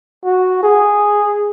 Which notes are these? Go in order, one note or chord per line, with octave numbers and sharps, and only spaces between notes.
F#4
G#4